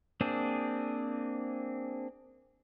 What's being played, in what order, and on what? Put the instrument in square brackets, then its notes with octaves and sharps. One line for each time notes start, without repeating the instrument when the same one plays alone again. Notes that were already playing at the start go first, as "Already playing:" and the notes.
[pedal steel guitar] A#3 C4 D4 G#4